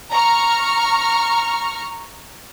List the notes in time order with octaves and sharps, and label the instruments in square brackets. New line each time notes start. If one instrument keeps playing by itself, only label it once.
[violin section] A#5 C#6 F6